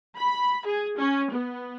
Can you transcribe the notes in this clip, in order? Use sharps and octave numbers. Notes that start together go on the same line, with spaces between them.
B5
G#4
C#4
B3